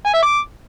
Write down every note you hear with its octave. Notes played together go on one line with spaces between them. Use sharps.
G#5
E5
D6